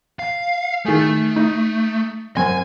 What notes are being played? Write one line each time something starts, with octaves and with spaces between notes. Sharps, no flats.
F5
D#3 A3 G#4
D#4
F#2 C4 G#5